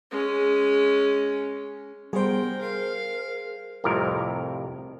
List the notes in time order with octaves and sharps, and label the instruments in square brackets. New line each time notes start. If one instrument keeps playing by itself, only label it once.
[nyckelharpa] G#3 C#4
[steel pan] G3 [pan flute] B3 [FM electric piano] G#4 C5 [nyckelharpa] A#4 G5
[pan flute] A#4 [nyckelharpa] F5
[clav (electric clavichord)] C2 F2 A2 C3 A#4